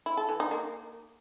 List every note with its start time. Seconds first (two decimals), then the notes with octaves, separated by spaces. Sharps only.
0.06 E4
0.17 A4
0.29 E3
0.40 D#4
0.51 A#3